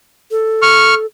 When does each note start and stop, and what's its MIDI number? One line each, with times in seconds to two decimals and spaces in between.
0.31 1.06 69
0.62 0.94 85
0.62 0.94 89